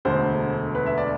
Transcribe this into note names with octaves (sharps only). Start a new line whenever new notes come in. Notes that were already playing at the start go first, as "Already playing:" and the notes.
E1 D2 D3 C5
B4
E5
D5